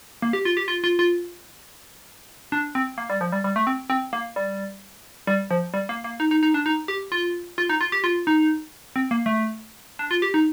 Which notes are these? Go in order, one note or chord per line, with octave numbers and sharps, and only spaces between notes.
A#3
G4
F4
G4
F4
F4
F4
D4
C4
A#3
G3
F3
G3
G3
A3
C4
C4
A#3
G3
G3
F3
G3
A#3
A#3
D#4
D#4
D#4
D4
D#4
G4
F4
F4
D#4
F4
G4
F4
D#4
C4
A#3
A3
D4
F4
G4
D#4